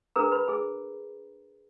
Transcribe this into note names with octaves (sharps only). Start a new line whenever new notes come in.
D4 G#4 A#4 B4 A#5
B4 B5
G#4 G#5